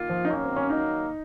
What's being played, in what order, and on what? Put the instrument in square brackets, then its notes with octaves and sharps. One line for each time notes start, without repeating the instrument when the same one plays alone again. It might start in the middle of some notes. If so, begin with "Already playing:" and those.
Already playing: [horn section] D#3 A#3 F4
[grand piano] F3
D#4
[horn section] D#3 F#3 A#3 [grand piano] C#4
[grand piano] C4
C#4
D#4